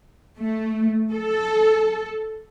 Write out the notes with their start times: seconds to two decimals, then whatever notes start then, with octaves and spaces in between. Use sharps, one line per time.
0.38 A3
1.12 A4